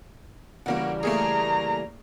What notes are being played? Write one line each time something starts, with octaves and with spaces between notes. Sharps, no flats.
C#3 E3 G3 A#3 F#4
A3 A#3 G#4 A#5